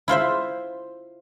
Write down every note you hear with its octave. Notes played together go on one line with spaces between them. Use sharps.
E4 F4 C5 E5